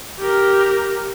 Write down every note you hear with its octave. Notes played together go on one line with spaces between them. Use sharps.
G4 A#4